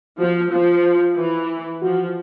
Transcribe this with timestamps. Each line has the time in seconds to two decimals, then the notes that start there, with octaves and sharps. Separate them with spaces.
0.19 F3 F#4
0.51 F3 F4
0.84 F4
1.17 E3
1.82 F3 F#4